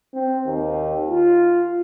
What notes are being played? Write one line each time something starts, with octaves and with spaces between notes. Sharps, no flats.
C4
D#2
F4